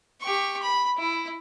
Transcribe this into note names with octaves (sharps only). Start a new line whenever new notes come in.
G4 C#6
B5
E4